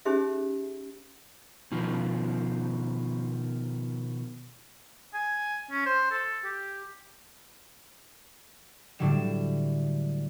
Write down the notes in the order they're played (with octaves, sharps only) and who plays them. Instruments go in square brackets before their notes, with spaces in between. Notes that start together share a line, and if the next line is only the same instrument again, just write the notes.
[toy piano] C#4 D#4 G4 G#4 C5 E5
[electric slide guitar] B2 D#3 F3
[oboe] G#5
C#4
C5
A4
G4
[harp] A2 D3 F#3 G3 E7